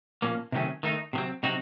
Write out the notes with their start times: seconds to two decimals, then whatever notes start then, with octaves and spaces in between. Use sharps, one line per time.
0.22 A#2 F3 A#3 C#4
0.52 C3 D#3 F#3 A3 C#4
0.83 D#3 A3 D#4
1.13 C3 D#3 F#3 C4
1.43 C3 F#3 C4 D#4 F#4